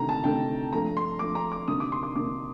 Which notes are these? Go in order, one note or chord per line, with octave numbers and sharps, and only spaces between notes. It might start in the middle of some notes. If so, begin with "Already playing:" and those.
Already playing: D2 C3 D#3 A3 A#5
A5
D2 C3 D#3 A3 G5
G2 F3 A3 A#5
C6
G2 F3 A3 D6
A#5
D6
D2 C3 D#3 A#3 D#6
D6
C6
D6
D2 C3 D#3 A#3 D6